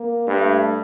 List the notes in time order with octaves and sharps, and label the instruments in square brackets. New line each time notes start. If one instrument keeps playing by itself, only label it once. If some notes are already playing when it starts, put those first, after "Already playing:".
Already playing: [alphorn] A#3
[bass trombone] G2 [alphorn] A3